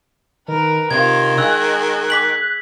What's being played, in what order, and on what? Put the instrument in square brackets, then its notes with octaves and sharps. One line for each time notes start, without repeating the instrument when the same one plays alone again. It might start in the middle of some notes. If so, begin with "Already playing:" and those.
[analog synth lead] D#3 [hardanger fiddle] A#4 B4
[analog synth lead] C3 [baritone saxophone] D#3 [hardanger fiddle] F4 [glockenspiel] G#6
[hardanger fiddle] G#3 [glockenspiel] E6 [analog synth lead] F#6
[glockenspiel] D6 B6 F#7